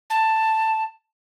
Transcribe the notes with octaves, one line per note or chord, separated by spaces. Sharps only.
A5